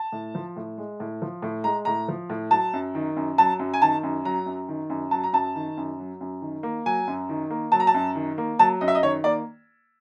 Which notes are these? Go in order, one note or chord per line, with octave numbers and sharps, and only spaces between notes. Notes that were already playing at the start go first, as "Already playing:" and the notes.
Already playing: A5
A2
F3
A2
G#3
A2
F3
A2
G#3 A#5
A2 A#5
F3
A2
F#3 A5
F#2
D#3
F#2
F#3 A5
F#2
G#5
D#3 A5
F#2
F#3 A#5
F#2
D#3
F#2
F#3 A5
A#5
F#2 A5
D#3
F#2
F#3
F#2
D#3
A#3
F#3 G#5
F#2
D#3
A#3
F#3 A5
A#5
A5
F#2
D#3
A#3
F#3 A5
F#2 D#5
E5
D#5
D#3 C#5
A#3 D5